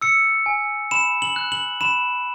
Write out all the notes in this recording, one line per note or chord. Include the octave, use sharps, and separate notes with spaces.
E6 C#7
G#5
B5 E7
F#7
F#6
F#7
B5 E7